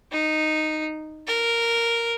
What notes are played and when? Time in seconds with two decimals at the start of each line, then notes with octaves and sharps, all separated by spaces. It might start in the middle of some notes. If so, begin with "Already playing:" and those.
0.11 D#4
1.27 A#4